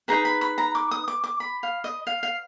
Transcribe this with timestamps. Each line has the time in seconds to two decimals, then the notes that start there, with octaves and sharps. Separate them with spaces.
0.08 D#4 G#4 B4 A#5
0.25 B5
0.41 B5
0.58 A#5
0.75 D6
0.91 D#6
1.08 D6
1.24 D6
1.40 B5
1.63 F5
1.84 D#5
2.07 F5
2.23 F5